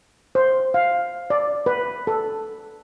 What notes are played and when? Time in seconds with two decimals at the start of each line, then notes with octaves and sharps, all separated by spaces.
0.35 C5
0.74 F5
1.30 D5
1.66 B4
2.07 A4